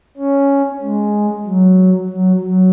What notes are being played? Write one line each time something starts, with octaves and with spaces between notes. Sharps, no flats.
C#4
G#3
F#3
F#3
F#3